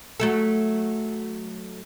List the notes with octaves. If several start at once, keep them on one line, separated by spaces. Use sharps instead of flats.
F#3 A3 A4